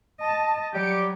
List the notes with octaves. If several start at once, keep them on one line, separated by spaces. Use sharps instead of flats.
D#5 A5
F#3 G3 G4 C#7 D7